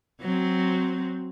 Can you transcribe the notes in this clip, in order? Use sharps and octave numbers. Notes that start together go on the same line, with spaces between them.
F#3 C4